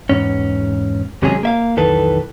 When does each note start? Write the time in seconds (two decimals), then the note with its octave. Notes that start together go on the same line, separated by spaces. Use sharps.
0.09 E2 G#2 C#4
1.22 D#2 C3 F#3 G#3 C#4 G#4
1.43 A#3 E5 F5
1.77 B1 F2 D#3 E3 A4 B4